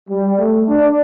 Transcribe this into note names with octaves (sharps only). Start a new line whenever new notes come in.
G3
A3
D4